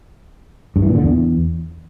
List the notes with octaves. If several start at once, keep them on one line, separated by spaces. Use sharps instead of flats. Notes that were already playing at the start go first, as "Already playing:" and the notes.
G2
E3
A#2
D3
E2